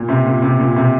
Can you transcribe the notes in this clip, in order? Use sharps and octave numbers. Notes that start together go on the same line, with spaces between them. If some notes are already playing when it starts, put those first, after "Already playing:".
Already playing: A#2
C3
A#2
C3
A#2
C3